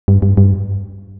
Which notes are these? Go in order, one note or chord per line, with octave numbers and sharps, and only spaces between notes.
G2
G2
G2